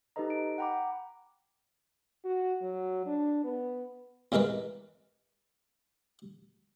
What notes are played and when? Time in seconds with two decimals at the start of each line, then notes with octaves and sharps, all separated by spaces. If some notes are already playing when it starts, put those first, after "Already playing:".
0.16 D#4 G4 A4 B4 D#5 A#5
0.30 D7
0.58 F#5 G5 A#5 B5 D6
2.25 F#4
2.62 F#3
3.06 D4
3.44 B3
4.32 E2 C3 G#3 A#4 B4